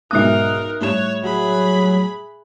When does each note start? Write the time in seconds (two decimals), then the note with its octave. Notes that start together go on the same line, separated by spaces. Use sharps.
0.11 B1 G#2 D#4 A#4 E5 D#6 F#6
0.81 A2 G3 C#5 E7
1.23 F#3 G#4 B5